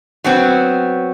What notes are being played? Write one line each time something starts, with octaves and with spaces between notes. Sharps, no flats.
F#3 B3 C4